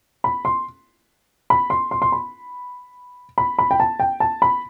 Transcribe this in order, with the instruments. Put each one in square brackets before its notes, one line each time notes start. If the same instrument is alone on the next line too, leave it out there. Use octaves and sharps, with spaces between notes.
[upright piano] B5
C6
B5
C6
C6
C6
B5
B5
B5
G5
A5
G5
A5
B5